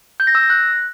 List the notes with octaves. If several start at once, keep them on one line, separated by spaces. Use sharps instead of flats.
G6
A#6
E6
A#6
F#6